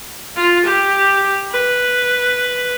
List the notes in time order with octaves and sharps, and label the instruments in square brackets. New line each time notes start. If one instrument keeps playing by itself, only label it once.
[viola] F4
G4
B4